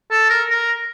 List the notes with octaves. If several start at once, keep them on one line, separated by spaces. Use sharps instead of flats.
A4
A#4
A#4